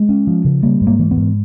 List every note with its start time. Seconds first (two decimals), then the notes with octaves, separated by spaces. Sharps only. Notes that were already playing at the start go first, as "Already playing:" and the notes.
Already playing: G#3
0.09 C#4
0.27 F3
0.45 C#3
0.63 G3 A#3
0.81 G#2
0.87 A#3
0.99 E3
1.11 B3
1.17 G#2